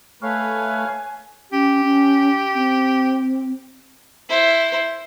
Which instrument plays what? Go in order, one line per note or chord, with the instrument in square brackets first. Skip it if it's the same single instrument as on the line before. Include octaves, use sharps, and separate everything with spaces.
[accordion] A3 [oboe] B4 [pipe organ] C#5 F5 [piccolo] G#5
[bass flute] C#4 [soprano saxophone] G4
[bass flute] C#4
C4
[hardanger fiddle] E4 C5